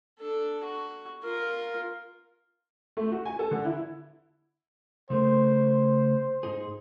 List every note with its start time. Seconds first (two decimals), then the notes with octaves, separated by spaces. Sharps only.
0.20 D4 A4
0.64 F#4
1.23 F4 A#4
2.97 A3
3.12 F#4
3.26 G#5
3.39 A4
3.51 D3
3.65 E4
5.10 C#3 A3 A#4 C5
6.43 G#2 D#4 G#4